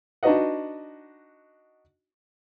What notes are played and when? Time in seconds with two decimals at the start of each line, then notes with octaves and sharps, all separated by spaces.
0.23 D4 D#4 F#4 B4 D#5 F#5